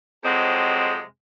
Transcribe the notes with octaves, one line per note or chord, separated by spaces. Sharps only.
F2 C3 F#3 G#3 C4 D#5